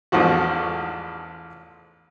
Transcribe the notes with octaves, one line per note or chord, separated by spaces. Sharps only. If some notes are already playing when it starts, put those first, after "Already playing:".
A1 E2 G#2 F3 F#4